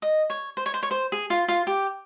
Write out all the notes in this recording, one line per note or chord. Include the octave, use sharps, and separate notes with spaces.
D#5
C#5
C5
C#5
C5
C#5
C5
G#4
F4
F4
G4